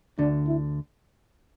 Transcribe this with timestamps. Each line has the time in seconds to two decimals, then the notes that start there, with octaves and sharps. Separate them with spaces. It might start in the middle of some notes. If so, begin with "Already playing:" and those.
0.18 D2 D3 D4
0.47 E4